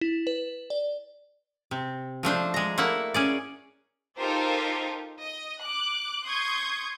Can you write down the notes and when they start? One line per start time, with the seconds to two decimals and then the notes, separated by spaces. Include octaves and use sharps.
0.01 E4
0.27 B4
0.70 D5
1.71 C3
2.23 F3 A3 D4 C5
2.54 G#3 A#5
2.78 A3 A#3 E4 F#5
3.14 C#4 G#4 D5
4.17 D#4 F4 G4 A4 A#4 C5
5.21 D#5
5.62 D6 F#6
6.25 C6 C#6 D#6 G6 G#6